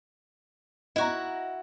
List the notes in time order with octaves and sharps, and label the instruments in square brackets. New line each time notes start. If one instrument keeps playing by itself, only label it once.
[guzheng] E4 F#4 [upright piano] D#5 A#5